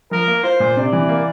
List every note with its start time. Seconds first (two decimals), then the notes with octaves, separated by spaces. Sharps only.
0.11 F3 A#4
0.28 A#3
0.43 F4 C5
0.60 A#2
0.76 C3 D5
0.92 E3
1.09 A#3